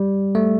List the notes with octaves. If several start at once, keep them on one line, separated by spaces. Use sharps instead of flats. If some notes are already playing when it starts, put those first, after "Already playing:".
Already playing: G3
A3